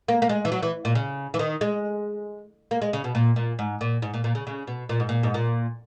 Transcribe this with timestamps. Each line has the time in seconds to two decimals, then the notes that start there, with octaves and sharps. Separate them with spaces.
0.08 A#3
0.22 A#3
0.29 G#3
0.45 E3
0.52 F#3
0.63 E3
0.85 A#2
0.95 C#3
1.34 E3
1.39 D#3
1.61 G#3
2.71 A#3
2.82 G#3
2.93 C#3
3.04 B2
3.15 A#2
3.36 A#2
3.59 G#2
3.81 A#2
4.02 G#2
4.14 A#2
4.24 A#2
4.35 C#3
4.47 C#3
4.67 B2
4.89 A#2
5.00 G#2
5.09 A#2
5.23 G#2
5.34 A#2